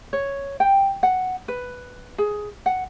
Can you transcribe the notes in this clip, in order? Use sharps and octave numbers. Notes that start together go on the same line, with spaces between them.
C#5
G5
F#5
B4
G#4
F#5